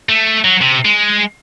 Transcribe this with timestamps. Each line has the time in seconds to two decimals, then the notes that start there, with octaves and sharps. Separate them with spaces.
0.09 A3
0.45 F#3
0.62 C3
0.85 G#3